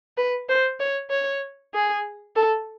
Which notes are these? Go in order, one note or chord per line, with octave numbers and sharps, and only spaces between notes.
B4
C5
C#5
C#5
G#4
A4